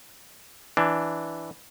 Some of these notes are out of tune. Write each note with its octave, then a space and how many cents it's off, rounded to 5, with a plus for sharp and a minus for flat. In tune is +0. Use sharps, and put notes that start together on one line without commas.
E3 +0 D4 +0